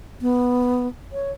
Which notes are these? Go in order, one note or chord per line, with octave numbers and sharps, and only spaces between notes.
B3
C#5